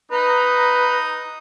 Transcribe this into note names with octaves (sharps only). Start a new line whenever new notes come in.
D#4 B4 A#5